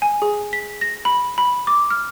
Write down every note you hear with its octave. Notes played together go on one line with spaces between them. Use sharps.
G#5
G#4
B6
A#6
B5
B5
D6
F6